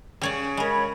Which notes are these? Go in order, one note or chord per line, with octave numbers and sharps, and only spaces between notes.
C#3 G3 C#5 D5
G#3 A#4 C#5 B5